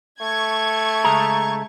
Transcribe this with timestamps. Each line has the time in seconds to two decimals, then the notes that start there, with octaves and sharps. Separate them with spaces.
0.21 A3 C#6 G#6
1.04 C#2 G#4 A#5